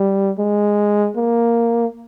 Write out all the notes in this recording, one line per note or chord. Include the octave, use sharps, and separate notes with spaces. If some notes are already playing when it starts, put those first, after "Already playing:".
Already playing: G3
G#3
A#3